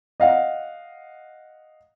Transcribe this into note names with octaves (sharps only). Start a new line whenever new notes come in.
D#5 F5 F#5